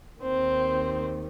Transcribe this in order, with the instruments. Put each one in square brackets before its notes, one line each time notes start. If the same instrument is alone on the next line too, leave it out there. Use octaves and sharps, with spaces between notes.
[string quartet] D#2 D#3 C4 C5